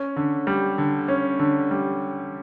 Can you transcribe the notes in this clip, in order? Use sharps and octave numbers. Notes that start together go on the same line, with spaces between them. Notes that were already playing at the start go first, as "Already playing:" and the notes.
Already playing: C#4
D3
G3
D3
C#4
D3
G3